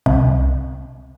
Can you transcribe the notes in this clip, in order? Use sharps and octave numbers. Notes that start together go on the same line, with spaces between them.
C2